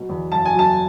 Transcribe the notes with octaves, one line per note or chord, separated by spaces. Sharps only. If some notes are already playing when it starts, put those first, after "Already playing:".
Already playing: B2 F#3
E2
F#1 A5
G#5
F#3
A5